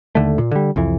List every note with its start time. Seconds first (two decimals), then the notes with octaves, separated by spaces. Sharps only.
0.15 D#2 D3 A3
0.38 A#2
0.51 D3 G3
0.76 C2 F2 E3